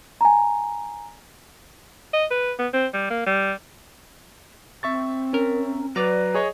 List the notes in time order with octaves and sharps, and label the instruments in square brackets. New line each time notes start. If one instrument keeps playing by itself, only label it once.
[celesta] G#5 A#5
[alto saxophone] D#5
B4
B3
C4
G3
A#3
G3
[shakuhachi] C4 [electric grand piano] E5 C#6 A6
[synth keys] C#4 A#4
[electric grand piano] F#3 [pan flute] B4 [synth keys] D5 A#5
[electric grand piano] G#4 C#5 D#5